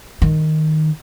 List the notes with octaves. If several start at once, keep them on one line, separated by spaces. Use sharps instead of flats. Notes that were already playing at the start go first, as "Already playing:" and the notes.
D#3